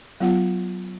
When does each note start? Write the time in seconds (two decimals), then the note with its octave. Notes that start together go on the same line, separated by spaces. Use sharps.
0.20 F#3 B3 F4 F#5